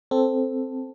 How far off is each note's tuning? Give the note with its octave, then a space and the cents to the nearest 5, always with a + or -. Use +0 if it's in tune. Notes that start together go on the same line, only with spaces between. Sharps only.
C4 +0 A4 +0